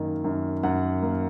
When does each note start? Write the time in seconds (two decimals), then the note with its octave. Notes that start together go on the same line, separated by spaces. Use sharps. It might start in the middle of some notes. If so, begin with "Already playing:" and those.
Already playing: F#2 D#3 A#3
0.24 F#2
0.63 F#2 F#5
1.02 A#3